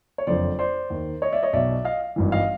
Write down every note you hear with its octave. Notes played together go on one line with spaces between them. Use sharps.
C#5
F#1 F2 D3 F3 C5 D5
C5 D5
D#2 D#3
C#5 D#5
D5 E5
C#5 D#5
B1 B2 D5 E5
D#5 F5
G#1 G2 E3
D#5 F5